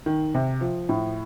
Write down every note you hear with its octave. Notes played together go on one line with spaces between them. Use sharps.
D#3
C3
F3
A2